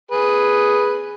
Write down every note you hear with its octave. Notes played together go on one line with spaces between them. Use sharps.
G#4 B4